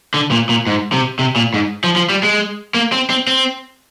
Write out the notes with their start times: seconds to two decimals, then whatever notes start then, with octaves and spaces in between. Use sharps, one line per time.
0.14 D3
0.31 A#2
0.49 A#2
0.67 G#2
0.92 C3
1.19 C3
1.36 A#2
1.54 G#2
1.84 F3
1.96 F3
2.10 G3
2.23 G#3
2.74 A#3
2.93 C4
3.10 C4
3.27 C4